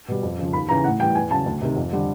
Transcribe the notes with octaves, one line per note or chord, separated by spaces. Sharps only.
B2 G3
F2
C#3 F3
D#2 B5
C#3 E3 A#5
A2 F#5
E3 G3 G5
E2 G#5
C#3 F#3 A5
D2
C3 D#3
F2
D3 G3